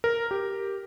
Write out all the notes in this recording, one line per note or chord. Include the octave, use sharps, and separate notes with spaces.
A#4
G4